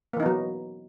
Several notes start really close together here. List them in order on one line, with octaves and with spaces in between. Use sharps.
A#3 E3 D#4 B3 F#3